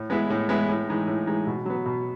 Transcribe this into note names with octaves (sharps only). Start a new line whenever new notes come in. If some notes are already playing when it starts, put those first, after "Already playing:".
Already playing: A2
G#3 B3 E4
A2
G#3 B3 E4
A2
E3 G#3 D#4
A2
E3 G#3 D#4
B2
F#3 B3
B2